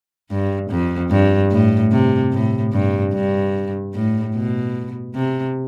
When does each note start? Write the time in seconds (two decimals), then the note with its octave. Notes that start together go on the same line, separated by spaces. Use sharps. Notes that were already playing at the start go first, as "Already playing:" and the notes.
0.30 G2
0.71 F2
1.11 G2
1.52 A2
1.92 C3
2.32 A2
2.73 G2
3.13 G2
3.94 A2
4.35 B2
5.15 C3